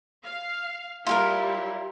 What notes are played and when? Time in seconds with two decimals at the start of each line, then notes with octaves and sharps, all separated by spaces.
0.24 F5
1.07 G3 E4 F4 G4 A#4